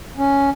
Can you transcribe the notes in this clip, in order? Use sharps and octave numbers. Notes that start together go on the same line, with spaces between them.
C#4